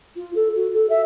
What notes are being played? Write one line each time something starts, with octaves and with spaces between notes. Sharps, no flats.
F4
A4
F#4
A4
E5